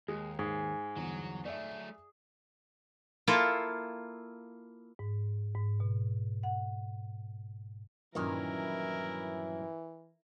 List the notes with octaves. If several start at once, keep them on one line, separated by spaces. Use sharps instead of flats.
D#2 G#3
G#2 G#4
G1 E2 F#3 F#4
F#3 A3 D5 E5
A#3 E4 F4 A4
G#2
G#2
B2
F#5
G2 A#2 D#3 E3 F#3 C#4 E4 A#4